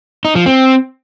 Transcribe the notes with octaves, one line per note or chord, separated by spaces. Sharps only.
D#4
F3
C4